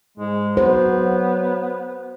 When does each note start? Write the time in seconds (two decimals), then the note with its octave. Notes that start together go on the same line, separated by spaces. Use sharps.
0.17 G#2 G#3
0.57 F#3 B3 C5